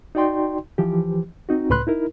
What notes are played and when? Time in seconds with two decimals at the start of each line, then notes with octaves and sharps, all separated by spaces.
0.15 D#4 F#4 D5 G5 C6
0.78 E3 F3 G4
1.49 C4 D#4 F#4
1.70 C#2 A2 B4 B5 C6 F#6
1.87 D#4 E4 A#4